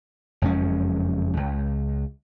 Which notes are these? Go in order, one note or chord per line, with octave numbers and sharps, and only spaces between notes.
F#1 F2 G#3 C#4
C#2